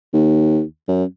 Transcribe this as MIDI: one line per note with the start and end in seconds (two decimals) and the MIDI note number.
0.14 0.62 39
0.88 1.04 42